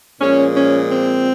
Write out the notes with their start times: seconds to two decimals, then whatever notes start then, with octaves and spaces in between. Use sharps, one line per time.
0.21 A#2 F3 G#3 C#4
0.55 C#4
0.90 C4